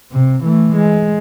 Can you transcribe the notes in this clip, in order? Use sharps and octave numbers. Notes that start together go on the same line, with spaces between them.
C3
E3 A3
G#3